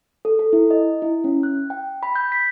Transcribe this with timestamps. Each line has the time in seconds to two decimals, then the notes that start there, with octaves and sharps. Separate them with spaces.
0.25 A4
0.39 A4
0.53 E4
0.71 D#5
1.02 E4
1.24 C#4
1.43 F#6
1.70 G5
2.03 B5
2.16 G6
2.32 B6